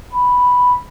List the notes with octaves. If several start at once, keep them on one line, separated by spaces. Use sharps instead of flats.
B5